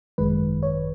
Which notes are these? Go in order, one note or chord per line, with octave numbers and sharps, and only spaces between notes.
G#1 F#2 D#3 G#3 B4
C#5